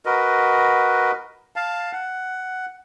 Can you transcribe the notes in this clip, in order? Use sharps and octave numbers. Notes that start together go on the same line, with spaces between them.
F#4 A#4 B4 D#5
F5 A5
F#5